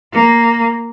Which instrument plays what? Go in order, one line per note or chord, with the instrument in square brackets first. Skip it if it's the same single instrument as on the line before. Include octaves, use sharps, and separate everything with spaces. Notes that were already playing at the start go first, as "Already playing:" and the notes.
[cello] A#3